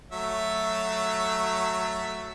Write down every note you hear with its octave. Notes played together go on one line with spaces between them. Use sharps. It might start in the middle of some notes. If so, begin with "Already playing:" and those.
F#3 A3 E5